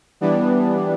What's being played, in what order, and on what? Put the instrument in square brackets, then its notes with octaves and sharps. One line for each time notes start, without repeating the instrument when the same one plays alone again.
[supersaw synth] E3 G3 B3 D4